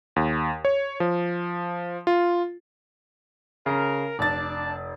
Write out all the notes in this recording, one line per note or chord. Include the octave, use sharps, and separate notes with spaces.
D#2
C#5
F3
F4
C#3 A#4
F1 D4 D5 A5 A6